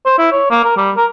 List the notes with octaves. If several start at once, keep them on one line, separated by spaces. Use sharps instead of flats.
C5
E4
C#5
A#3
A#4
G3
A#4